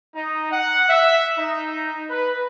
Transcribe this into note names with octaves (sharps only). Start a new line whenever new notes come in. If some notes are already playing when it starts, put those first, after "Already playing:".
D#4
F#5
E5
D#4
B4